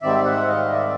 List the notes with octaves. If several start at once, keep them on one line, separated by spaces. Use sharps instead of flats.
G#2 D#3 G3 C4 D5 E5
E5 F#5
D#5 F5
D5 E5